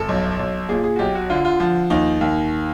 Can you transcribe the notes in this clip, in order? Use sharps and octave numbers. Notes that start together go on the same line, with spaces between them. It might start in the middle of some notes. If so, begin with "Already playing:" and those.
Already playing: G1 A4
B1
B1
A#2 G#4
G#4
F#4
B1 G4
F#4
D3 F4
F4
F3
D#2 D#4
D#2